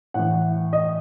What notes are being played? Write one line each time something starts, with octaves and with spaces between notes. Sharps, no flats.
A2 E3 F#5
F#5
D#5